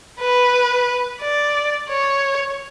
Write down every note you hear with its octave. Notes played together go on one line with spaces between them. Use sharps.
B4
D5
C#5